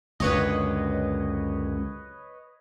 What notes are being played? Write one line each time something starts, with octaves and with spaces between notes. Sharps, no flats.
C#2 F#2 D3 B4 C#5 D#5